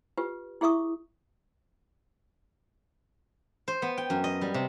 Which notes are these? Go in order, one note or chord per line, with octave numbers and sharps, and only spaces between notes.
F4 G4 B4
E4 G#4 E5 C#6 D#6
C5
B3
G5
F#2
D#5
G3
C3